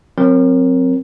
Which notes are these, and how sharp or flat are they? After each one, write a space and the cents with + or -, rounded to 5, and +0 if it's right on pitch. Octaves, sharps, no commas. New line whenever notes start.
F#3 -30 C4 +0 A#4 +0